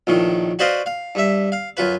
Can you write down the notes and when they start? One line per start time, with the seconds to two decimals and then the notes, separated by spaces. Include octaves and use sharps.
0.07 A#1 A2 D#3
0.59 F#4 B4 C5 D5 D#5 F5
0.86 F5
1.15 G2 E5
1.52 F5
1.77 F#2 F4 B4